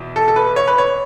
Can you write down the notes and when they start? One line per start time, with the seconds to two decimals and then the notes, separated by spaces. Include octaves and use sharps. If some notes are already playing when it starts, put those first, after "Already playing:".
Already playing: E2 B2
0.16 A4
0.28 A4
0.36 B4
0.56 C#5
0.68 B4
0.78 C#5